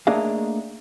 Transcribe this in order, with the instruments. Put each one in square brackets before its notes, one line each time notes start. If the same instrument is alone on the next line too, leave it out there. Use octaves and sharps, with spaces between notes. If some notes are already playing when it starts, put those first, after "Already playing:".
[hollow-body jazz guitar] A3 A#3 D4 G#4 D#5 F5